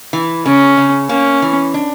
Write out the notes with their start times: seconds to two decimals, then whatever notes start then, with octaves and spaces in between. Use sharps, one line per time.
0.13 E3
0.46 C#3 C#4
0.77 C#3
1.09 A#3 C#4
1.42 E3
1.74 D4